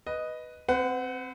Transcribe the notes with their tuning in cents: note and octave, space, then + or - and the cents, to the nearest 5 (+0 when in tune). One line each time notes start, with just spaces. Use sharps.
B4 +0 D#5 +0
C4 +0 B4 +45 F#5 +0